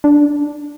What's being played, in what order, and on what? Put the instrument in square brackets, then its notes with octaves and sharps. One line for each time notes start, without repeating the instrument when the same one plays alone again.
[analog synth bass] D4